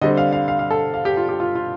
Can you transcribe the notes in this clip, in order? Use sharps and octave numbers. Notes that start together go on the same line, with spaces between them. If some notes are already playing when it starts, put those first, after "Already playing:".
D3 G3 C4 D#5
F5
F5
F5
F5
A4
F5
G4
F4
G4
F4
F4